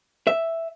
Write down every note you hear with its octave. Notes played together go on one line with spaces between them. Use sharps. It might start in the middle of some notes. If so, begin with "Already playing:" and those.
E5